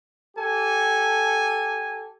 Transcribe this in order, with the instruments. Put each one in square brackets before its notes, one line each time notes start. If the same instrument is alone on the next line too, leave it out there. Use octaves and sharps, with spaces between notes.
[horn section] G4 A4 G#5